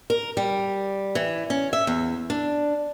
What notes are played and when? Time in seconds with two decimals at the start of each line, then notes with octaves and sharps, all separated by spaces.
0.10 A#4
0.37 G3
1.15 E3
1.50 C#4
1.73 E5
1.87 E2
2.30 D4